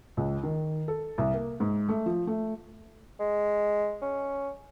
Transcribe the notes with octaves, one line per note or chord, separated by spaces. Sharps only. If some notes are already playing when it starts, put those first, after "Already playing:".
C#2
D#3
A4
C2
A#3
G#2
A3
F3
A3
G#3
C#4